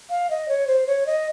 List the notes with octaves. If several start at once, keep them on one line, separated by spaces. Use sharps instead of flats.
F5
D#5
C#5
C5
C#5
D#5